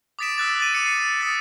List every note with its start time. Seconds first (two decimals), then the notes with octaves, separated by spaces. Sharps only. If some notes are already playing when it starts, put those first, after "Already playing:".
0.19 D6 D#6 A6 B6 D7 E7
0.38 D#6 E6 F#6 A6
0.60 A6 D#7
0.74 D6 C#7
0.86 C7
1.20 D#6 A6 B6